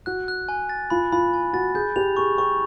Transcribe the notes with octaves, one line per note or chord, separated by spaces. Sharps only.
F#4 F#6
F#6
G#5
A6
F4 B5
F4 B5
G#5
F#4 A6
G#4 G6
G4 F7
G#4 C#6
G4 C#6